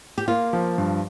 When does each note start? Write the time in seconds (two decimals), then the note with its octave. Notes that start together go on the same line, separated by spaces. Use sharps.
0.18 G4
0.28 A#3 F4
0.53 F3
0.78 G2